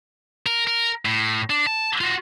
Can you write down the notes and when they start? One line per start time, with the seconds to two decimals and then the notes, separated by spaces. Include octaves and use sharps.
0.46 A#4
0.67 A#4
1.05 A2
1.50 D4
1.67 A5
2.01 F4 F#4